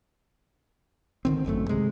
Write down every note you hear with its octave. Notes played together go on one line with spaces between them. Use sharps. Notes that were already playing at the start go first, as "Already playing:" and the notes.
D3 D#3 C4
G#1 F#2 C#3 A3
C3 G#3